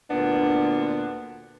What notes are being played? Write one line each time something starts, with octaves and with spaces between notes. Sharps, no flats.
D2 A#2 B3 D4